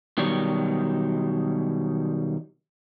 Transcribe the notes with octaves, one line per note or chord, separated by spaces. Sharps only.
B2 D#3 F#3 G3